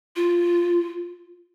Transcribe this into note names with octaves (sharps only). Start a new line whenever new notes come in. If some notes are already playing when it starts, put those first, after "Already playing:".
F4